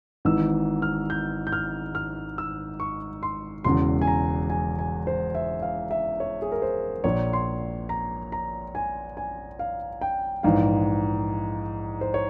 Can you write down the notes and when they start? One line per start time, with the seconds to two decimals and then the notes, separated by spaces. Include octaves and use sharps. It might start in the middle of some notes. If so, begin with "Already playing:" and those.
0.25 G#1 G#2 E3 E6
0.82 F6
1.10 G6
1.47 G6
1.53 F6
1.95 F6
2.38 E6
2.80 C#6
3.23 C6
3.64 E1 E2 C#3 C6
4.01 G#5
4.07 A#5
4.50 G#5
4.79 G#5
5.07 C5
5.35 E5
5.62 F5
5.91 E5
6.20 C#5
6.42 G#4
6.52 A#4
6.62 C5
7.04 A#1 A#2 C#5
7.33 C6
7.89 A#5
8.32 A#5
8.75 G#5
9.17 G#5
9.59 F5
10.01 G5
10.43 A#1 G#2 E3 F5
12.01 C5
12.14 C#5